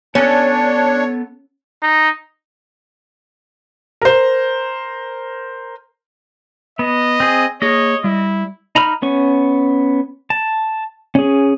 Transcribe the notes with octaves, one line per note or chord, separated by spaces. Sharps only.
B3 C#4 D4 A4 C#5
D#4
A#4 C5
B3 D#5
C4 G#4
A#3 G#4 C#5 D#5
G3 E4
D#4 A#5 B5 F6
B3 C#4 C#6
A5
C#4 G#4